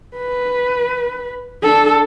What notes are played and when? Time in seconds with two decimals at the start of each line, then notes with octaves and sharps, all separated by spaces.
0.17 B4
1.63 D4 A4